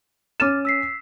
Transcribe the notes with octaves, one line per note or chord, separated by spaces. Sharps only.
C#4 D6 F6 A6 D#7 E7
E6 B6 C7